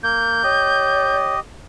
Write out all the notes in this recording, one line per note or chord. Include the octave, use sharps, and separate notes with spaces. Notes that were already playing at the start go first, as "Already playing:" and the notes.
A#3 G6
G4 C#5 D#5